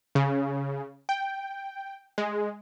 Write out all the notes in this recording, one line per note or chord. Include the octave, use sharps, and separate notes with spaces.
C#3
G5
G#3